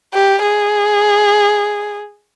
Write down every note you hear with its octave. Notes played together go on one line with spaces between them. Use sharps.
G4
G#4